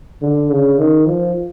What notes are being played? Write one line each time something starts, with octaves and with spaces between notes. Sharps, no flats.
D3
C#3
D#3
F3